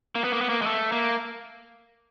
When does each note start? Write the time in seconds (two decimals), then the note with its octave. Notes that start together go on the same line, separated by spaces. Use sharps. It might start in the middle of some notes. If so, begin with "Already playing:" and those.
0.15 A#3
0.24 B3
0.33 A#3
0.41 B3
0.49 A#3
0.62 G#3
0.66 A3
0.92 A#3